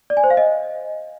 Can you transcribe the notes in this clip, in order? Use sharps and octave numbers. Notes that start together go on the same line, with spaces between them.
D5
G#5
C5
F5
D#5